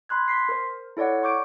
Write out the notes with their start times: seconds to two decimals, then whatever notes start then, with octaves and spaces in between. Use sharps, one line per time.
0.09 B5 C6 F#6 G#6
0.28 C6 B6 C7
0.49 A#4 C5
0.97 E4 A4 C#5 D5 F#5
1.23 C#6 D6 G6 D7